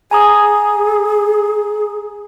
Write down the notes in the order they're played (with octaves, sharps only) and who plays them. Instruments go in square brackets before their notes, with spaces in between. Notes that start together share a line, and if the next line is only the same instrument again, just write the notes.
[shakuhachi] G#4 [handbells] G#5 A#5 D#6